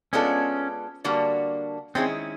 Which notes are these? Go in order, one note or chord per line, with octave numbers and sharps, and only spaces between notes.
G#3 B3 C#4 D4 F4 A4
D3 G3 A#3 D4 F#4
D#3 G#3 C4 C#4 E4 G#4